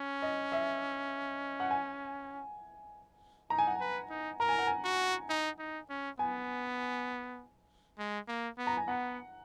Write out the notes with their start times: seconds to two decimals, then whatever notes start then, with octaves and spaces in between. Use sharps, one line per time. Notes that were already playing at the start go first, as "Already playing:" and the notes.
Already playing: C#4
0.22 D#5
0.52 E5
1.60 F#5
1.71 G#5
3.50 D#4 A#5
3.58 G#5
3.67 F#5
3.76 B4 G#5
4.10 D#4
4.40 A#4 A#5
4.49 G#5
4.59 F#5
4.67 G#5
4.84 F#4
5.29 D#4
5.59 D#4
5.89 C#4
6.19 B3 G#5
7.98 G#3
8.28 A#3
8.58 B3
8.67 A#5
8.77 G#5
8.88 B3 F#5